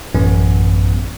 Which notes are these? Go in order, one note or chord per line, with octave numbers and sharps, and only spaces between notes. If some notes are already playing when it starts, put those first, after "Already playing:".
A1 F#2 B3